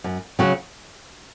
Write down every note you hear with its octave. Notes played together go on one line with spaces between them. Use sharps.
F#2
C#3 F#3 C#4 F#4